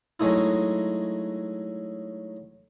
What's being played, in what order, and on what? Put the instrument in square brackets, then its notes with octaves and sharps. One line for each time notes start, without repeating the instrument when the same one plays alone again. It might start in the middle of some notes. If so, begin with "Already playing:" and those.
[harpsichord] F#3 G#3 A3 D#4 E4